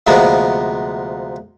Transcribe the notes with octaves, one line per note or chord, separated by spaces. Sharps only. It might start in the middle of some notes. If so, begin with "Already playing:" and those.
D2 C3 F3 G#3 A#3 B3